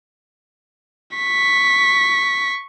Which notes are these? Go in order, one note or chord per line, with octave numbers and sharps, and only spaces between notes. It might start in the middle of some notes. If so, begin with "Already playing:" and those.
C#6 B6